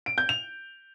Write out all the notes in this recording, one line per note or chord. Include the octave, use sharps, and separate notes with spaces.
D7
G6
F7